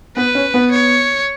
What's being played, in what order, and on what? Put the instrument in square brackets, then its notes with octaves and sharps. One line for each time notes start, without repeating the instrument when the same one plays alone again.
[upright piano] B3 [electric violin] B4
[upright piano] C#4
B3
[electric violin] C#5